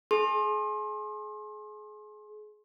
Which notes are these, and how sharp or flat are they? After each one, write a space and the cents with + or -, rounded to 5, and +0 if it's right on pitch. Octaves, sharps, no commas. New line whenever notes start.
G#4 +30 C6 +30